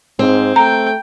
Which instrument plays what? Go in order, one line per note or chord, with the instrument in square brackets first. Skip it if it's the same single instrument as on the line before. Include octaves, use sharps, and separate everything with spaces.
[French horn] G#2 [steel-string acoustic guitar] C4
[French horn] A3 [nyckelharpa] G5 [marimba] A#5